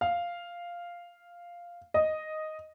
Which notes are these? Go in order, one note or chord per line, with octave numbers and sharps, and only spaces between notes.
F5
D#5